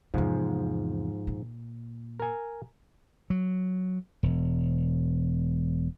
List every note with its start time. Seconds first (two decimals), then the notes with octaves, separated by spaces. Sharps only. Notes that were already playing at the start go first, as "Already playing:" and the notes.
0.14 E2 G#2 C3 F3
1.27 A#2
2.20 A#4 G#5
3.30 F#3
4.23 E1